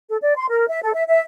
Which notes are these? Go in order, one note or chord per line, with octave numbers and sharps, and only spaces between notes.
A4
D5
C6
A#4
E5
A4
E5
E5